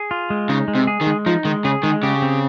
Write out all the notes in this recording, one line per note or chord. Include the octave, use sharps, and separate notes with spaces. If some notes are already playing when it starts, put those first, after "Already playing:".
Already playing: G#4
F4
G#3
C#3 D#4
G#3
C3
G#4
D#3
G#3
F3 D#4
D#3 G#3
C#3 G#4
D#3 G#3
C#3 G4
C4